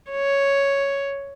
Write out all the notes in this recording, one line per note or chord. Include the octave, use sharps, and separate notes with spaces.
C#5